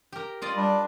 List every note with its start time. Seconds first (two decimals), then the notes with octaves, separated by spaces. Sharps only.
0.12 G4 A#4
0.42 F4 D5 D#5
0.57 G3 D4